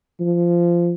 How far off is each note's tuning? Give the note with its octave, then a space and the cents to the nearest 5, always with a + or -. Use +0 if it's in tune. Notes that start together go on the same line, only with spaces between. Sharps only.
F3 -15